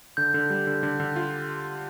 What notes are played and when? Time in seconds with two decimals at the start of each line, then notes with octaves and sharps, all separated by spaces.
0.17 D3 G6
0.34 D3
0.50 G3
0.67 D3
0.83 D3
1.00 D3
1.16 F4